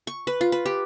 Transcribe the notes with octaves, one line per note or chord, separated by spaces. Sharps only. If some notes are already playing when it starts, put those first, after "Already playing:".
C#6
B4
F4
B4
G4